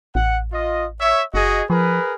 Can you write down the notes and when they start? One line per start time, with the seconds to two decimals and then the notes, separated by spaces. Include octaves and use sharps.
0.15 A1 F#5
0.53 F4 D#5
1.00 C#5 E5
1.34 F#1 F#4 G#4 D#5
1.70 F3 G#4 A#4 B4